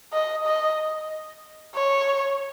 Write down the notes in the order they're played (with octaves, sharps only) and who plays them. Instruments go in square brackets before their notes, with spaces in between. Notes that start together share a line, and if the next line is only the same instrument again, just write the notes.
[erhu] D#5
D#5
C#5